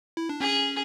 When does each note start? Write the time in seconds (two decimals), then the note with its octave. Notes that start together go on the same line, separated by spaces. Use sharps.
0.17 E4
0.29 D4
0.41 C#4 G#4